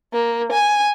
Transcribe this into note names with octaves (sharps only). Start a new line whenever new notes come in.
A#3
G#5